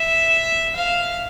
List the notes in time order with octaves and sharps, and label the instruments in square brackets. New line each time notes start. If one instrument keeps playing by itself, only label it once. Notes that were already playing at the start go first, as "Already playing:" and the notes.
Already playing: [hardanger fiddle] E5
F5